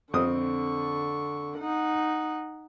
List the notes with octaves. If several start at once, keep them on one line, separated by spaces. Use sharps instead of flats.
F2 D3 C4 C#6 D#6
D#4 F#5